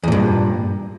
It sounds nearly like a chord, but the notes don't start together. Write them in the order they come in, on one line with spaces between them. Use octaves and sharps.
E2 A#2 G2